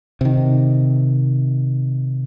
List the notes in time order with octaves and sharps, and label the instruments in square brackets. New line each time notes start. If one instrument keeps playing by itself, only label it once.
[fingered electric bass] C3 D#3